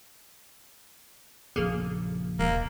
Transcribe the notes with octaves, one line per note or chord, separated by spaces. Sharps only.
A#1 F#2 C#3 A#3 G#4 A4
D#1 A#3